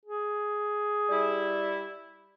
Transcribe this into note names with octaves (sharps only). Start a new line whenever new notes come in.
G#4
G3 E4